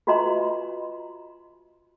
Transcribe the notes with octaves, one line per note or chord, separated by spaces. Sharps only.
F4 F#4 B4 D#5 A#5 C6